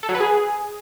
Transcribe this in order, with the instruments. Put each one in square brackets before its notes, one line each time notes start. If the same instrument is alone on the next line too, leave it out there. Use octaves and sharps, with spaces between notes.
[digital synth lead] A4
F#3
B4
G#4